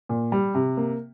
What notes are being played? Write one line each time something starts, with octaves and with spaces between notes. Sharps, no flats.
A#2
G3
C3
A#3